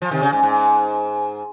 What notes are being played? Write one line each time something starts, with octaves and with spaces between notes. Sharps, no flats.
F3
C3 D#3
C#3
G#2
G#2